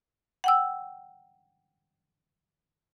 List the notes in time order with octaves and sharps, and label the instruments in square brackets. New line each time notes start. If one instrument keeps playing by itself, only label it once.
[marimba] F#5 G5 E6